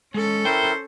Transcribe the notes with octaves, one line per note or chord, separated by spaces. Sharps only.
G#3 C#4 A4
E4 A#4 C5 G5